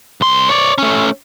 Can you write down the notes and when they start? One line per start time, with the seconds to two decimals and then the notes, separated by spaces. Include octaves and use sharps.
0.21 C2 C6
0.49 C#5 D5
0.78 A3 C#4